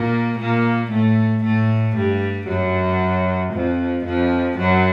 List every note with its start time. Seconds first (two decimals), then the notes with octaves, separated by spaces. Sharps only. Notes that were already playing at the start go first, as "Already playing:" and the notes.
Already playing: A#2 A#3
0.38 A#2 A#3
0.91 A2 A3
1.43 A2 A3
1.96 G2 G3
2.47 F#2 F#3
3.52 F2 F3
4.05 F2 F3
4.58 F#2 F#3